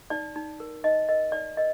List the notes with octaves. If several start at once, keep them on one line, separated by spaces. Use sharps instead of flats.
D#4 D5
D#4
A#4
D#4 D#5
A#4 D#5
D#4 D5
A#4 D#5